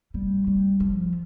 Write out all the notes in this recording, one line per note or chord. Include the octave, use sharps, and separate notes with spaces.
G3
G3
F3